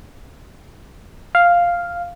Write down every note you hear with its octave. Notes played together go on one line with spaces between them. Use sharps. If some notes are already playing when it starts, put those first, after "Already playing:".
F5